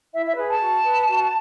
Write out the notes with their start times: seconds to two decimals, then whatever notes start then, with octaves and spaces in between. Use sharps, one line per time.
0.13 E4 E5
0.25 E5
0.36 G#4 B4
0.48 A5
0.60 F#4
0.84 B4
1.07 F#4